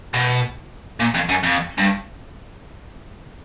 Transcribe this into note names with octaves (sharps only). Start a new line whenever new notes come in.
B2
A#2
F2
F#2
F2
G2